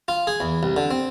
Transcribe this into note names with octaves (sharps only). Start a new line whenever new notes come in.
F4
G#4
E2
C2
D3
C4